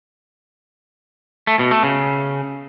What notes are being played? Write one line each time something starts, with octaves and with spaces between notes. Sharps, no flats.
A3
B2
A3
C#3